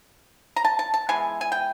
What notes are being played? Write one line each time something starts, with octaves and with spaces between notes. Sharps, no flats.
A#5
A5
A5
A5
E3 G#3 B3 G#5
G#5
G5